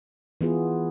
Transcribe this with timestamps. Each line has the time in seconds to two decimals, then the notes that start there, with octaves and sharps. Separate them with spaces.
0.41 E3 B3 F4 G#4